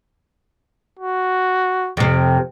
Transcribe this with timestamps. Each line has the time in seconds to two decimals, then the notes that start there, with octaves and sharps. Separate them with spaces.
0.99 F#4
1.97 F2 C3